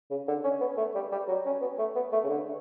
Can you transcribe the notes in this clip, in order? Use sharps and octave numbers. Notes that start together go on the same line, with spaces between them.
C#3
D3
C#4
B3
A3
G3
G3
F#3
C#4
B3
A3
B3
A3
C#3
D3